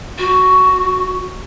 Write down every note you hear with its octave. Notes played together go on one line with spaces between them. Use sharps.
F#4